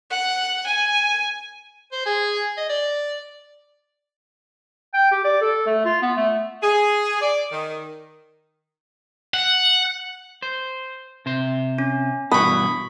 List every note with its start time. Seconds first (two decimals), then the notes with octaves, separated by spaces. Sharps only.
0.10 F#5
0.66 G#5
1.92 C5
2.06 G#4
2.57 D#5
2.69 D5
4.94 G5
5.11 G4
5.24 D5
5.41 A4
5.67 A3
5.85 F4
6.02 B3
6.17 A3
6.62 G#4
7.21 D5
7.51 D#3
9.34 F#5
10.42 C5
11.26 C3 C5
11.78 C#4
12.32 G2 B2 E3 B5 C#6 D#6